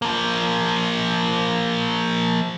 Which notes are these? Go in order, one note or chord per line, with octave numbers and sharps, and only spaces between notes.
F3 A#3